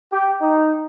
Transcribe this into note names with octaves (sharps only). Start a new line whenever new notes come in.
G4
D#4